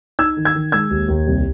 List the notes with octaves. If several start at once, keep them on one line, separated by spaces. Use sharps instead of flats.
D#4 E6 G#6
D#3
E6 G#6
D#3
G#3 E6 G#6
D#2
D#2
C2